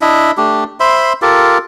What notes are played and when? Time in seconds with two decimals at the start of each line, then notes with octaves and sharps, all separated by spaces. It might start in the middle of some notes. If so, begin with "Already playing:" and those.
0.01 D4 E4 D#5 E5
0.37 A3 D4 G4
0.80 C5 E5 B5 C6
1.22 F4 G4 A4 A#4